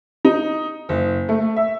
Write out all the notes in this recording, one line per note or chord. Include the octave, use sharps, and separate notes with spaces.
D#4
F#1
A3
E5